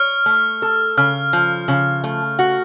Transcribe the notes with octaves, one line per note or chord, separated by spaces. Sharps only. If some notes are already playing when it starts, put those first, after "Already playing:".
Already playing: C#5 F6
A3
A4
C#3 F6
F3
C#3
A3
F#4